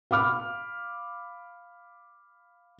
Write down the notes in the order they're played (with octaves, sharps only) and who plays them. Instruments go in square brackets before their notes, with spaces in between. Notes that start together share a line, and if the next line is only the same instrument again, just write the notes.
[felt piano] F5 B5 D6 F6